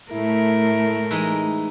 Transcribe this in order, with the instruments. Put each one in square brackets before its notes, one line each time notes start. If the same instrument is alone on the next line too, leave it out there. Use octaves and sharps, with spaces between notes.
[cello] A2 A3 [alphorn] E4 [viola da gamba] A#4
[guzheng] E3 G#3 D#4